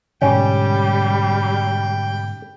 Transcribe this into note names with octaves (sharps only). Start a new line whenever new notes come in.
G#2 B2 D3 G3 C#4 G5